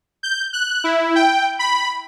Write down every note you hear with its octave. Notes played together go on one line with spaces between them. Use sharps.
G6
F#6
E4
G5
B5